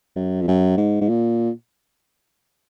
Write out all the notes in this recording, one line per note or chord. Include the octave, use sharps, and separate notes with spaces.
F#2
F2
F#2
G#2
G#2
A#2